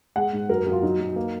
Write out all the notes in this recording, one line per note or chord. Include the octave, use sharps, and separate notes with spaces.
G#3 F#5
G#2
F#2 A#4
F#2
F4
F#3 D#4
F#2
A#3